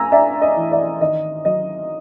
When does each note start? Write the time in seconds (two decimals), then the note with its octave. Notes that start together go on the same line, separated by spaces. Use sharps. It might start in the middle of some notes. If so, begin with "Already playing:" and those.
Already playing: A3 G#5 A#5 E6
0.12 D4 D5 E5
0.42 D#5
0.56 E3
0.72 D5 E5
1.01 D#3 D#5
1.45 F#3 D#5